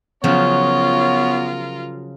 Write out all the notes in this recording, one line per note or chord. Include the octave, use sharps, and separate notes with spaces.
C#3 F3 F#3 B3 F4 A#4 C#5